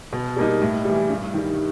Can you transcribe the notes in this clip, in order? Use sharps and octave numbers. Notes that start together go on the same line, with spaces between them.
B2
G3 A#3 D#4
A2
E3 G3
G2
D#3 G3